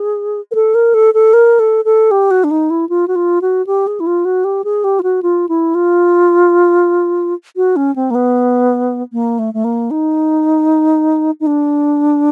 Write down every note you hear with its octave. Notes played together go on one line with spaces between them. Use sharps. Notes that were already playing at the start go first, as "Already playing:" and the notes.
Already playing: G#4
A#4
A4
A#4
A4
A4
A#4
A4
A4
G4
F#4
D4
D#4
E4
F4
F#4
F4
F#4
G4
G#4
E4
F4
F#4
G4
G#4
G4
F4
F#4
F4
E4
F4
F#4
C#4
C4
A#3
B3
A#3
A3
A3
A#3
D#4
D#4
D4